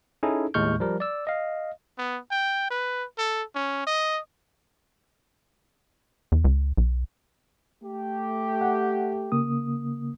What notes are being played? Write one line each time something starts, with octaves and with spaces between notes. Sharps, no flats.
C#4 D#4 E4 G#4 A4
D#2 A2 G#3 C#6 F6 G6
F3 G3 A#4
D5 E6
D#5 F5
B3
G5
B4
A4
C#4
D#5
E2
C#2
B1
A3 G4
F#5
C#3 A#3 D#6